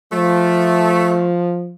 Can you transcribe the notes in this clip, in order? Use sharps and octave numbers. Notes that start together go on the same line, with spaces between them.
F3 A3